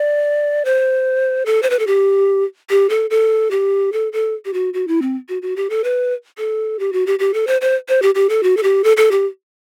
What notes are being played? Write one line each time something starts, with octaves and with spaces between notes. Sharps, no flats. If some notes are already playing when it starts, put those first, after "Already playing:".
Already playing: D5
C5
A4
C5
B4
A4
G4
G4
A4
A4
G4
A4
A4
G4
F#4
F#4
E4
C4
F#4
F#4
G4
A4
B4
A4
G4
F#4
G4
G4
A4
C5
C5
C5
G4
G4
A4
F#4
A4
G4
A4
A4
G4